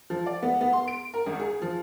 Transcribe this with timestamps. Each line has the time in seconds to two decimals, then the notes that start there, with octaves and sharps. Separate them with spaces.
0.10 F3
0.26 D5
0.43 B3
0.61 B3
0.73 C6
0.88 D7
1.14 A#4
1.26 G#1
1.40 G#4
1.62 F3